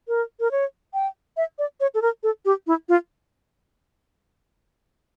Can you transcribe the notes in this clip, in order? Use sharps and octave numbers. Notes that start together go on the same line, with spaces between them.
A#4
A#4
C#5
G5
E5
D5
C#5
A4
A#4
A4
G4
E4
F4